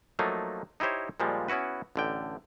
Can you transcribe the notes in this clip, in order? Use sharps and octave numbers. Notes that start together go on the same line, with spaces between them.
F3 F#3 A3 A#3 D#4
D#4 E4 G4 C5 C#5
A#2 F3 G3 G#3
B3 C#4 E4 F#4 B4
A1 D3 G5